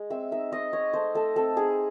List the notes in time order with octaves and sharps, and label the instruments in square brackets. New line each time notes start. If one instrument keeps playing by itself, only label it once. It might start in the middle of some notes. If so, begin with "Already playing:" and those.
Already playing: [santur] G#3
C4 E5
D#4 E5
C4 D#5
D#4 C#5
A3 C5
A3 A4
C4 A4
D#4 G#4